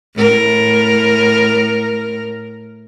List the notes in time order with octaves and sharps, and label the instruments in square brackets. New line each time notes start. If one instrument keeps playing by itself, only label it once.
[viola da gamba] A2 A#4